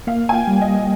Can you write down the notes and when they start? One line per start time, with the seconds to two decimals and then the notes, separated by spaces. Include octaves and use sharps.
0.07 A#3 F5
0.29 G#5
0.34 G5
0.47 G3
0.61 D#5